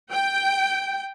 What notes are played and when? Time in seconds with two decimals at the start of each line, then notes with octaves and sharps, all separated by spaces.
0.11 G5